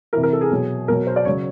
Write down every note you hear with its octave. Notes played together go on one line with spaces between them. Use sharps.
C3 E3 A#4
A#4
A4
G#4
B2 F#3
B2 F#3 A#4
C5
D5
C#3 F#3 C#5